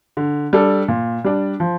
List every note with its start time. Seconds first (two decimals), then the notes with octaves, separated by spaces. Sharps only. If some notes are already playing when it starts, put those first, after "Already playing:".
0.17 D3
0.53 G3 D4 A4
0.88 A#2
1.25 G3 D4
1.60 F3